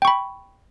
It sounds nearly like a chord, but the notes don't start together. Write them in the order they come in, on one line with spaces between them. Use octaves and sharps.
G5 C#6 B5